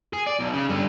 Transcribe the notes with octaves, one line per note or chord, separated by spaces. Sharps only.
G#4
D5
B1
C#3
G2 D3